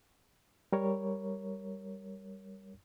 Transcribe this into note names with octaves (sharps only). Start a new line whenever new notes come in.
G3 A#4 C#5